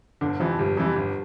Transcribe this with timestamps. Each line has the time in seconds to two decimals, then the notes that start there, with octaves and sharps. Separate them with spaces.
0.21 G1 D3
0.40 F2 C3 E3 F3
0.58 G1 G3
0.77 F2 C3 E3 G3
0.96 G1